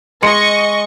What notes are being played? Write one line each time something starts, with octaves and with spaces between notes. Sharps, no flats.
G#3 D#5 C6 C#6 C#7